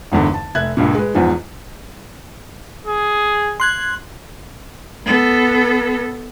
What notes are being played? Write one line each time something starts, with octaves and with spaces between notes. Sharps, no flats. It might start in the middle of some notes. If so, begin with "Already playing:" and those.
G#1 E2 G2 D3
A5
F1 E5 F#6 G#6
C#2 G2 A#2
G#3 B4
E2 G#2 F3
G#4
C6 F#6 G#6
B3 A4